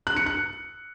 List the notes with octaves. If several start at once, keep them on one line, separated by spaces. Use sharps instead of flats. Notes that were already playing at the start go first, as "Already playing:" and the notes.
F#6
C#7
F#6